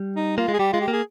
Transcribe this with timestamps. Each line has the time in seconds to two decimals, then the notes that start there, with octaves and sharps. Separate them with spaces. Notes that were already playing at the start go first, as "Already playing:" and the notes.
Already playing: G3
0.16 D#4
0.38 A#3 F4
0.48 G#3
0.54 G#4
0.59 G3 G4
0.73 G#3 F4
0.81 G4
0.88 A#3
0.93 G#4